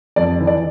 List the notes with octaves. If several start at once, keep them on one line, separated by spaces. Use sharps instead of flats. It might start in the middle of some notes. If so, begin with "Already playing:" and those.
F2 D5
E3
D5